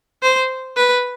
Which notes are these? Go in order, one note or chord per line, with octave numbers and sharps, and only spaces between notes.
C5
B4